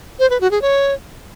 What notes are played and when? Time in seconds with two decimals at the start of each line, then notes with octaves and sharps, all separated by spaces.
0.19 C5
0.30 B4
0.41 F#4
0.51 G#4
0.62 C#5